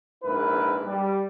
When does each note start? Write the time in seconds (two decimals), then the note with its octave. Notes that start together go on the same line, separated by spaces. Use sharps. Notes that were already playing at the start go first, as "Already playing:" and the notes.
0.23 A#1 G#2 E4 A#4 B4
0.85 G3